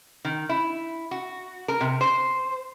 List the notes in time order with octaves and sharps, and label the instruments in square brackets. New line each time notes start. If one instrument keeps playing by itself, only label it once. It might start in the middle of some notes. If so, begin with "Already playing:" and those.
[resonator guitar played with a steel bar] D#3
E4
F#4
A#4
C3
C5